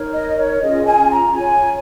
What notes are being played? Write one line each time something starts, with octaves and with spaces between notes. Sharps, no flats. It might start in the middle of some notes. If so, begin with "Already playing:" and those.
Already playing: D#4 A#4 C#5
D#5
C#5
C#4 F4 G#4 D#5
G#5
A#5
F4 C#5 G#5